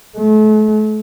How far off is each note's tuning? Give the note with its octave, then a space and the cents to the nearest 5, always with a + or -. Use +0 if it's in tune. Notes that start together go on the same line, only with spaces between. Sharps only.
A3 -40